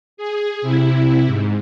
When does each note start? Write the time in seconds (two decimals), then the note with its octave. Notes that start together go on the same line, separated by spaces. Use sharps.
0.17 G#4
0.62 C3 E4
1.26 G#2